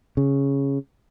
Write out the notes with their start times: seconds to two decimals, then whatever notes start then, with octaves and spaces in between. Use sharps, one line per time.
0.17 C#3